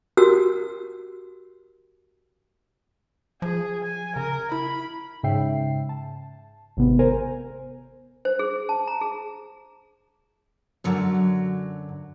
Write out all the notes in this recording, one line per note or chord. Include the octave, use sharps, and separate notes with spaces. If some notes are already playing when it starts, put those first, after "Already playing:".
F#4 G4 A#4 E6
F3 G#4
G#5
C#3 A#4
E4 B5
G#2 C#3 E5 G5 C7
A5
G#1 C3 B3
A#4 C5 G#5 A#5
C5
G#4
A5
A#5
G#4
F#2 D3 F#3